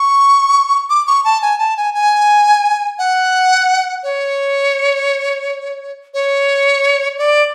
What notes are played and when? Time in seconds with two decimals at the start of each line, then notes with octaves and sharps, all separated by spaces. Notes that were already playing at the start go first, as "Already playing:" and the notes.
Already playing: C#6
0.89 D6
1.07 C#6
1.25 A5
1.42 G#5
1.58 A5
1.77 G#5
1.94 G#5
2.99 F#5
4.03 C#5
6.14 C#5
7.18 D5